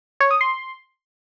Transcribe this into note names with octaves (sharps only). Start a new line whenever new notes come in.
C#5
D#6
C6